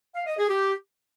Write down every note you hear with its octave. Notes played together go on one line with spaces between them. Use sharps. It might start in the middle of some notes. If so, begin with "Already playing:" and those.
F5
D#5
G#4
G4